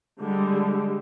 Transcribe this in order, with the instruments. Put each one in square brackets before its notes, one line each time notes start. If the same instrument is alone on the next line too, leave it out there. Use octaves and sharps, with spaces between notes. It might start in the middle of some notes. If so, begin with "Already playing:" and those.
[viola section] D3 G3 G#3